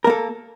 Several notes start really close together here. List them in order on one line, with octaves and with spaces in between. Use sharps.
A#4 A#3 A4